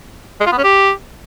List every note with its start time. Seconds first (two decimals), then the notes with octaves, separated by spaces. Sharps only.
0.40 G#3
0.46 F4
0.52 B3
0.58 C#4
0.64 G4